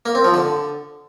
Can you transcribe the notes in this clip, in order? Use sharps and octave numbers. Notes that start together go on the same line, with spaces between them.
A#3
C4
F3
D3